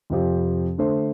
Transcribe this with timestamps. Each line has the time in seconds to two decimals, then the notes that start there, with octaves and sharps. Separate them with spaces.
0.10 F2 C3 F3 C4 G4
0.78 D3 A3 D4 A4 C5